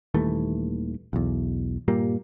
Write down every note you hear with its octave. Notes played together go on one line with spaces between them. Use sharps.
D#1 D#2 E3 A3
B1 E2
G2 A#2 G3 A#3